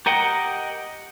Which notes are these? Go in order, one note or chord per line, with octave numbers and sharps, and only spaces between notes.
G4 A#4 D#5 F#5 G5